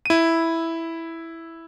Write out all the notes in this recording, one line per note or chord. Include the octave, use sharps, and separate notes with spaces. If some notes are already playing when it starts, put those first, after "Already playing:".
E4 D#7